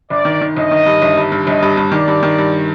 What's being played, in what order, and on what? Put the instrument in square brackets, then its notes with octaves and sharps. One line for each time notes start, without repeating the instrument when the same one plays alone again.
[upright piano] G1 [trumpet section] D5
[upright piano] D#3
D#3
[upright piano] G1 [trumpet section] D#5
[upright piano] D#3
G2
G1
G2
G2
[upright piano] G1 [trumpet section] D#5
[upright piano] G2
G2
[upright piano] D#3 [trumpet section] D5
[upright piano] G2
D#3
G2